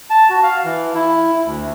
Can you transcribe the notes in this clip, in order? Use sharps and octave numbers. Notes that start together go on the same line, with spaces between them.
A5
F#4
F5
E3
E4
D2